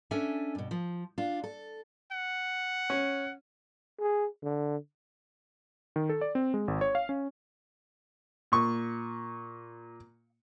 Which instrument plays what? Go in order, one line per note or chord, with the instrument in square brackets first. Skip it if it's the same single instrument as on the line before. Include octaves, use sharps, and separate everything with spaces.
[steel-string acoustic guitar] C#4 D4 A4 E5 G#5
G2 B2
F3
D4 F4
A4
[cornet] F#5
[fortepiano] C#4
[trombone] G#4
D3
[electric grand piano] D#3
A4
D5
C4
G#3
G#1
C#5
F5
C#4
[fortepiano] A#2 C#6